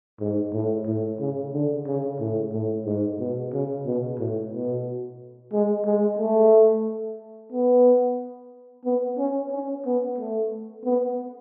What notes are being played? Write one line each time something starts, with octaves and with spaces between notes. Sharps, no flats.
G#2
A2
A2
C#3
D3
C#3
A2
A2
G#2
B2
C#3
B2
A2
B2
G#3
G#3
A3
B3
B3
C#4
C#4
B3
A3
B3